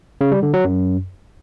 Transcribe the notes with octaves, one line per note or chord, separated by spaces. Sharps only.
C#3
G3
D3
F#3
F#2